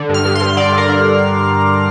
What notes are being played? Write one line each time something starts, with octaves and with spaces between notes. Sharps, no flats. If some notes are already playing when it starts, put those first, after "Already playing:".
Already playing: D3
G2
F6
G2
C6
G2
D3 D5
D3 A#4
D3